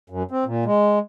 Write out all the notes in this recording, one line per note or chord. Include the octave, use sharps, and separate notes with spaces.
F#2
C4
A#2
G#3